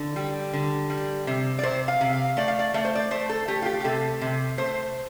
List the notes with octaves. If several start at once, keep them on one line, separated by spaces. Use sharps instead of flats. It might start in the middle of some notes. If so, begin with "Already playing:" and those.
Already playing: D3
G3 G4
D3
G3
C3
D5
C3 C5
F5
C3
F5
A3 D5
F5
D5
A3 D5
C5
D5
A3 C5
A4
A3 G4
F4
G4
G4
C3 A4
C3
A3 C5